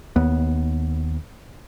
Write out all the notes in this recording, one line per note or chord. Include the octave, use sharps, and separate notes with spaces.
D#2 B3